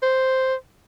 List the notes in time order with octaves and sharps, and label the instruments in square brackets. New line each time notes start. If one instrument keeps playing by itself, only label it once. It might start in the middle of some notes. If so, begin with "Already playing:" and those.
[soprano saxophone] C5